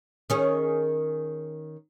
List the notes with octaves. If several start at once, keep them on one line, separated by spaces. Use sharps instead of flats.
D#3 C#4 G#4